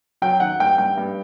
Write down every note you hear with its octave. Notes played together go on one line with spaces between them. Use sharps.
F#3 G5
D#3 F#5
G2 G5
G2 G5
G2